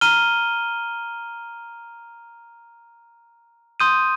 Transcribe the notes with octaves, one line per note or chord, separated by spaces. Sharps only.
A#5 F6 D#7 G7
C6 D#6 G6 D#7